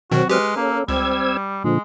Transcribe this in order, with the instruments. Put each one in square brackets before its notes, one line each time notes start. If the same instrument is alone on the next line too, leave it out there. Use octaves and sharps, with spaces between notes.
[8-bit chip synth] B2 D#3 [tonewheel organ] F#3 C4 [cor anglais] F#4
[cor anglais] G#3 [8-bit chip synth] G4 B4 F6
[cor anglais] A#3 [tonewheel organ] C#4 A4
[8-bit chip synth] C#2 [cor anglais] G3 [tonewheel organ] C4 E6 G#6
[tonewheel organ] A#2 D3 F3 [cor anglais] G#3